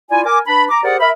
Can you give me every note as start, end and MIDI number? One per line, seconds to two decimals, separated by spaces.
0.10 0.24 64
0.10 0.24 65
0.10 0.24 74
0.10 0.24 80
0.26 0.39 70
0.26 0.39 80
0.26 0.39 86
0.47 0.65 62
0.47 0.65 71
0.47 0.65 81
0.47 0.65 83
0.70 0.80 82
0.70 0.80 86
0.83 0.96 67
0.83 0.96 68
0.83 0.96 70
0.83 0.96 72
0.83 0.96 74
0.83 0.96 78
1.00 1.10 70
1.00 1.10 76
1.00 1.10 83